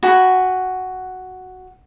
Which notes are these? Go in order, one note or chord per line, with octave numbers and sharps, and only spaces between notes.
F#4 G#5 B5